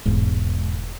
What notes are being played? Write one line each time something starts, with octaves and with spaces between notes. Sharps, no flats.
E1 G#2